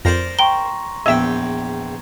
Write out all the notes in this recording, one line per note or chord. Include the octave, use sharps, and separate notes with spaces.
F2 A#4 C5 D5 A#6
G5 A#5 C6 C#6 G7
A#1 E2 D#5 E5 G5 E6 G#6